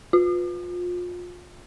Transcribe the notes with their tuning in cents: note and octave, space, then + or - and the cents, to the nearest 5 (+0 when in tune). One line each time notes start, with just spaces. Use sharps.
F4 +30